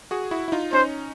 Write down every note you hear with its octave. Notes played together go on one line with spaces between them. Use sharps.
F#4 G#4
E4 F#4
E4
D#4 F4
C#4 D#4 C5